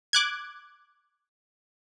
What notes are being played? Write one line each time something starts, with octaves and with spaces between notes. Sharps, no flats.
D6 F#6 G#6